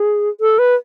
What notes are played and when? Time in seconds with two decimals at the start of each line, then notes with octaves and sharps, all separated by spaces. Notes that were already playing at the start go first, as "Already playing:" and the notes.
Already playing: G#4
0.41 A4
0.59 B4